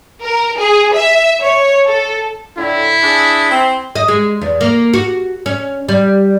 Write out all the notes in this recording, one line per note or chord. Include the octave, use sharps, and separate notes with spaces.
A#4
G#4
E5
C#5
A4
A2 D3 E4
D4 G#4
C4
D#5
G#3
E2
A#3
F#4
C#4
G3